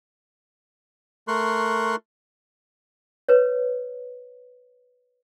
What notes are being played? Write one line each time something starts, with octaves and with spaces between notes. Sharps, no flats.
A3 A#4 C6 C#6 F#6
B4 C#5